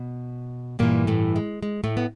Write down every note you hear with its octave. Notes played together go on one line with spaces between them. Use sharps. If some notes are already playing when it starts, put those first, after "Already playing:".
Already playing: B2
G2 A#2 E3 A#3
A2 A3
G#3
G#3
A2 A3
B3